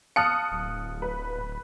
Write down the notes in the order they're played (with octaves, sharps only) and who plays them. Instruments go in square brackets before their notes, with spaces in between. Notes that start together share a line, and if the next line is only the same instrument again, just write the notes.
[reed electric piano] F5 A5 F6 [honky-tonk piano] D#6 F#6 C#7
[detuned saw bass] D1
[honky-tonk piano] B4